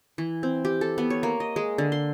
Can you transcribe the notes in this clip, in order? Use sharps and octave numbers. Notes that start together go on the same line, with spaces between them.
E3
C4
G4
A4
B3
C#5
A#3
D#5
G#3
D3
C6